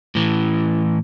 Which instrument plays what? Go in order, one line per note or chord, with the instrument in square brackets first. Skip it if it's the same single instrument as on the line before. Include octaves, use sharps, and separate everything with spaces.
[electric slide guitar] A2 E3